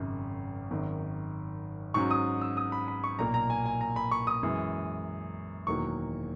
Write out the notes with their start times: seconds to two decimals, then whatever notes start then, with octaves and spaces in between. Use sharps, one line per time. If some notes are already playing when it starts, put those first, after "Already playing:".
Already playing: G#1 F#2 C#3
0.71 G#1 F#2 D#3
1.94 G#2 F#3 C#4 C#6
2.11 D#6
2.41 E6
2.57 D#6
2.72 B5
2.88 B5
3.04 C#6
3.19 B1 A#2 A#3 A#5
3.34 A#5
3.50 G#5
3.66 G#5
3.81 A#5
3.96 B5
4.11 C#6
4.27 D#6
4.43 F#2 E3 G#3
5.67 E1 E2 D#3 F#3 A#3 C#6